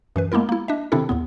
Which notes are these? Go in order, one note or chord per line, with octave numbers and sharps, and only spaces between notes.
F#2 E3 B4
G#3 A#3 B3 E4 A#4
A#3 E4
D4 D#5 E5
C3 D#3 C4 D4 E4 A4
D#2 A2 B3